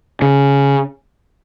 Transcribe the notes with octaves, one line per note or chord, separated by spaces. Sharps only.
C#3